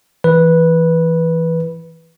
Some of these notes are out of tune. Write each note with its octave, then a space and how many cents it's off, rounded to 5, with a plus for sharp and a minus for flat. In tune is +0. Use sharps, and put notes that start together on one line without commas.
E3 +0 B4 -10